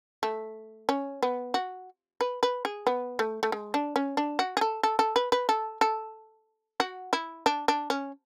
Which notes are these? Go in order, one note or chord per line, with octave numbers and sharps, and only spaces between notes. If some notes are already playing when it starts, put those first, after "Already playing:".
A3
C#4
B3
F#4
B4
B4
G#4
B3
A3
A3
G#3
D4
C#4
D4
F#4
G#4
A4
A4
A4
B4
B4
A4
A4
F#4
E4
D4
D4
C#4